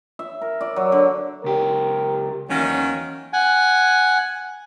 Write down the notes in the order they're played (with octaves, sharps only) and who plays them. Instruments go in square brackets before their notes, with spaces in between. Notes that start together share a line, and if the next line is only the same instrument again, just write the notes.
[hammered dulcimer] E5
A#4
D5
F#3
D3
[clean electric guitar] C#2 G4 [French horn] A#4
[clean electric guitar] E2 [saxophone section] D#3 F#3 C#4 [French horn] A#3
[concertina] F#5 G#5